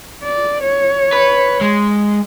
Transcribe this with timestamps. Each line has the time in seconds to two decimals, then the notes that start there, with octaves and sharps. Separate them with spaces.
0.23 D5
0.63 C#5
1.13 B4
1.61 G#3